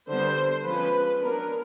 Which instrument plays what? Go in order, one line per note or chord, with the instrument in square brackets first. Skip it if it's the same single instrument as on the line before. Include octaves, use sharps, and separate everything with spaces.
[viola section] D3 G3 B3 C5
F3 G#3 C#4 B4
F#3 B3 D4 A#4